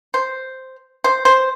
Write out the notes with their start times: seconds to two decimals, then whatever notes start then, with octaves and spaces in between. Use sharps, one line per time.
0.14 C5
1.04 C5
1.25 C5